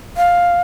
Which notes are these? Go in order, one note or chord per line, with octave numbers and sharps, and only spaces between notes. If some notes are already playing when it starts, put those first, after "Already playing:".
F5